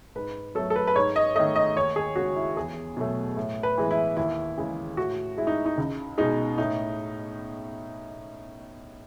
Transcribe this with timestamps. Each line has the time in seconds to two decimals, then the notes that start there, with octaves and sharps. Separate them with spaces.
0.15 G#2 B4
0.55 F#3 A3 A4
0.70 A4
0.76 B4
0.87 B4
0.96 G#2 C#5
1.16 D#5
1.35 D#3 A3 D#5
1.56 D#5
1.75 D#2 C#5
1.96 G#4
2.16 C#3 G#3 F#4
2.36 E4
2.56 E2 G#4
2.97 B2 F#3 A3
3.37 A2
3.63 B4
3.78 E3 G#3
3.91 E4
4.17 D#2 E4
4.57 C#3 E3 G#3
4.97 A2 F#4
5.37 G#3 E4
5.47 D#4
5.66 D#4
5.78 C#2
6.18 B2 G#3 D#4
6.58 A2 D#4